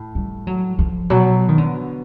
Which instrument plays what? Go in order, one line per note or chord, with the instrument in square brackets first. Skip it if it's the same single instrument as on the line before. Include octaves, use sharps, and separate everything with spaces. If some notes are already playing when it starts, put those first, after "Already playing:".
Already playing: [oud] A2
[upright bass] G3
F#3
F3
[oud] B2 [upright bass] F#3
[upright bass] D#3
D3